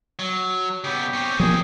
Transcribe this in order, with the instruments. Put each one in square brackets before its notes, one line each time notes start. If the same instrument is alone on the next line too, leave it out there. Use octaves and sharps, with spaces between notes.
[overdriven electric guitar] F#3
[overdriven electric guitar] C#3 B3 [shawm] G4
[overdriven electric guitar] C4 C#4
[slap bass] F3 F#3 A#3 [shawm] G#4